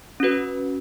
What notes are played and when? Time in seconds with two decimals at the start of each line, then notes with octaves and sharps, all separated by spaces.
0.20 C#4 F#4 B4